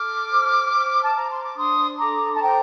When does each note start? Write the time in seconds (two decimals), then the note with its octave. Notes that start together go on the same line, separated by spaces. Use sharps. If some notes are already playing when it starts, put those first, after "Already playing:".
Already playing: A4 D6 F6
0.31 C5
0.72 C5
1.02 A5
1.14 C5 A#5
1.30 C6
1.43 D6
1.57 D4 C6 D#6
1.98 A4 A#5 D6
2.34 A5
2.40 C5 G5 A#5